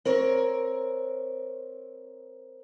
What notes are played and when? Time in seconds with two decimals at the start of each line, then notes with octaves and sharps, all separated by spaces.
0.05 C4 A#4 C#5